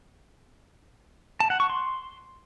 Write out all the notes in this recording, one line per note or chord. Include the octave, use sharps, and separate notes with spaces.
A5
F#5
C#6
C6